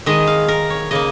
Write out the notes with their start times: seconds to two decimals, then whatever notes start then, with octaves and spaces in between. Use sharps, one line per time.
0.06 D#3 G#3 D#5
0.27 F5
0.48 A#4
0.70 C#5
0.91 C#3 A#3 D#5